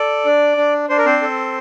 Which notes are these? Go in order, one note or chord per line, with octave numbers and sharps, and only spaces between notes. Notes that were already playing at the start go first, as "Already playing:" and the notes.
Already playing: A4 D5
D4
D4
D4 C5
A#4
C4 C5
A4